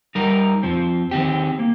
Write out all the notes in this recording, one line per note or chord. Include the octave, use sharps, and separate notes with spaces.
G3 D#4 A#4
F2 F3 C4
D#3 C4 G4
A#3